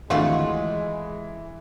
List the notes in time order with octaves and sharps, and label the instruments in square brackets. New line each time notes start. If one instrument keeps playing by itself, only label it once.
[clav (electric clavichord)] G#1 D2 [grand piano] E3 [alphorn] G#3 [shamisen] A3 F4 F#4